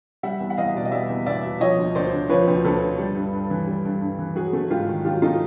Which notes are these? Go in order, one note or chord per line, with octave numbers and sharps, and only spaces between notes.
G3 E5 F#5
E2
F#5
E2 D#5 F5
B2 D5
D#5
G3 D5 E5
E2
E2 D5 E5
B2
F3 C#5 D#5
D2
D2 C5 D5
D3
F3 B4 C#5
D2
D2 A4 B4
D3
G3
G2
G2
E3
G3
G2
G2
E3
F#3 F#4 G#4
A3
G#2 F4 G4
D#3
F#3 F4 G4
A3 D#4 F4